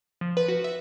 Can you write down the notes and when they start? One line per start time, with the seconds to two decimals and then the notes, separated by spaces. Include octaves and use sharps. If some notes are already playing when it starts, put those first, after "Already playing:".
0.21 F3
0.37 B4
0.48 F#4
0.64 E5